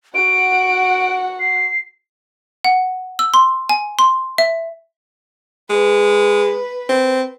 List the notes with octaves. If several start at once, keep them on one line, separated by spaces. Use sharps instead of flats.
F#4 F#5 D7
C7
F#5
E6
C6
G#5
C6
E5
G#3 B4
C4